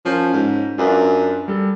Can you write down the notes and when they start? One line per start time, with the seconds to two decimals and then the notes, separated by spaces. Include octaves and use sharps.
0.05 F3 C#4 A#4 G6
0.33 G#2
0.78 F#2 D4 F4 B4
1.48 G3 A4